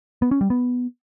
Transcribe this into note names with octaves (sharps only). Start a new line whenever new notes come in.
B3
C#4
G3
B3